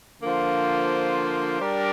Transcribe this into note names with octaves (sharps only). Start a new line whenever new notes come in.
D3 F3 A#3 F4 C5
G3 D4 G4 A#4